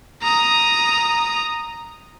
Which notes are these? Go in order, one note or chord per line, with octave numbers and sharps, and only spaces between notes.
A#5 D#6